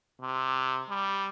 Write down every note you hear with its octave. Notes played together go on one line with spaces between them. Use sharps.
C3
G3